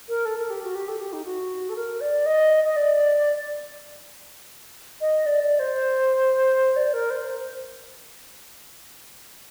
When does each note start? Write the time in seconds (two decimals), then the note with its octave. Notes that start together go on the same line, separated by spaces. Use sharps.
0.09 A#4
0.25 A4
0.38 A#4
0.50 G4
0.64 F#4
0.75 G4
0.88 A4
1.01 G4
1.13 D#4
1.25 F#4
1.69 A4
1.76 A#4
2.01 D5
2.26 D#5
2.64 D#5
2.77 D5
5.01 D#5
5.26 D5
5.43 D5
5.59 C5
6.76 D5
6.93 A#4
7.10 C5
7.27 C5